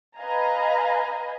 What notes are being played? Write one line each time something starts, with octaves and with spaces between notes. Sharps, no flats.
B4 D#5 F5 G#5 A#5